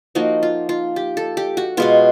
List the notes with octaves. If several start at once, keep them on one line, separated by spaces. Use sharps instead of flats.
F3 A#3 D#4 F#4
F4
F4
G4
A4
G4
F#4
B2 G#3 B3 F4